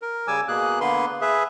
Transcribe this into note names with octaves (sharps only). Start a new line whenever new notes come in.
A#4
C#3 G3 G#5 D6 E6
B2 A#3 G#4 F#6
D3 A#3 B3 B4 C6
G#4 B4 E5